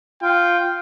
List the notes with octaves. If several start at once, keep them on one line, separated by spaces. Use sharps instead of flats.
F4 G5